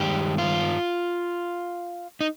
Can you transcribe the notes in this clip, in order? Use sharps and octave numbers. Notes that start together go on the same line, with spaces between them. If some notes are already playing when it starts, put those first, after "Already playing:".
Already playing: G2 D#3 G#3 G4
F4
D#4